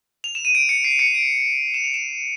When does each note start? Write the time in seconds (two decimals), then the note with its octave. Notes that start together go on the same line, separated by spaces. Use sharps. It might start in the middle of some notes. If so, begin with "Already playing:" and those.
0.24 F7
0.35 E7
0.45 D#7
0.55 D7
0.69 C#7
0.84 C7
0.99 C#7
1.14 D7
1.74 E7
1.84 F7
1.94 E7